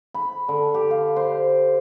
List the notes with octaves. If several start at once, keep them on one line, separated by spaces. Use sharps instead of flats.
B5
D3
G4
F5
C5